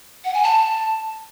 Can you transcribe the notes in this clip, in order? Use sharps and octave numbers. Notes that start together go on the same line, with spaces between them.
F#5
G#5
A5